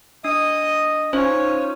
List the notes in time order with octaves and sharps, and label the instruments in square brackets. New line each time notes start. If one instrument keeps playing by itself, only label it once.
[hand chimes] D4 [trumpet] D#5 [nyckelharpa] D#6
[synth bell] C#4 D#4 [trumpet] F4 [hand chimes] C5 [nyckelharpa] C#5